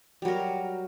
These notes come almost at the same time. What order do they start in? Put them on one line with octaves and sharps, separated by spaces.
G3 F#3 A#4